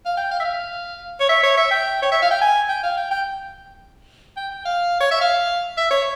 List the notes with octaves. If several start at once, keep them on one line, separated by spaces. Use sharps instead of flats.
F5
G5
F5
E5
F5
C#5
E5
C#5
E5
G5
C#5
E5
F5
G5
G#5
G5
F5
G5
G5
G5
G5
F5
C#5
E5
F5
E5
C#5